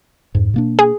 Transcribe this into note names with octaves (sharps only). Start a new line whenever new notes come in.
F2 G#2
B2 A#3 D4
G#4